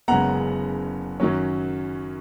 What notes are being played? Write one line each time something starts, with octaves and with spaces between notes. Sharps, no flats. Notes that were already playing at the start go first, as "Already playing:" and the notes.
F#1 F#2 C#3 G#3 B3 F#5 A#5
F#2 D#3 F#3 C#4